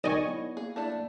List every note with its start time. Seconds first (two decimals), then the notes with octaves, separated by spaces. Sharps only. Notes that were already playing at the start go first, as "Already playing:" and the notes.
0.04 B1 D#3 D5 D#5 G#5 C#6
0.27 B3 E4 C#5
0.57 A#3 G#4
0.76 A3 D4 E4